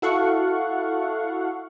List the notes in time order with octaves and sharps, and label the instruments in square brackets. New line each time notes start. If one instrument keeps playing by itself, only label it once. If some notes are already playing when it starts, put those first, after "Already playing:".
[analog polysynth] E4 F#4 A4 F5 F#5 C#6